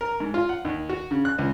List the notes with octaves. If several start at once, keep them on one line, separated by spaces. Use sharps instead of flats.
A#4
G#2
F4
F#5
D#2
F#4
C#3
F#6
C#2